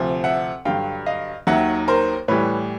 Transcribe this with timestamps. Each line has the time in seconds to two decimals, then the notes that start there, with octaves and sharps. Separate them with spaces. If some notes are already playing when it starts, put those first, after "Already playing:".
Already playing: D2 C3 F3
0.24 E5 F#5
0.65 G2 D3 F#3 F5 G5
1.06 D#5 F5
1.47 D#2 D#3 F#3 E5 F#5
1.88 A#4 C5
2.28 A2 E3 G3 B4 C#5